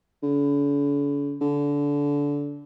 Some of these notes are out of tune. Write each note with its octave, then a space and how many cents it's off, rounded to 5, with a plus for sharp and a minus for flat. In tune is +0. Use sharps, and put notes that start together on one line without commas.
D3 -45
D3 -25